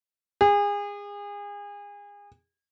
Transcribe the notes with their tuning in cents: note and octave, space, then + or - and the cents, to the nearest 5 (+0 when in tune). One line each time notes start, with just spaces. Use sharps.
G#4 -30